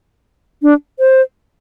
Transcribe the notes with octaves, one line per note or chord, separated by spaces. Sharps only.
D4
C5